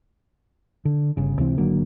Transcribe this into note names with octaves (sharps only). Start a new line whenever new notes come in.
D3
G1 C#3
C#2 C3 E3 C4
G#1 D3 F#3 A#3